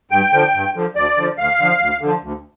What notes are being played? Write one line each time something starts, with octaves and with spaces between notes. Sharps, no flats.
G2 G5
D3 F3
G2
D3 F3
D2 D5
D3 F3
D2 F5
D3 F3
D2
D3 F3
D2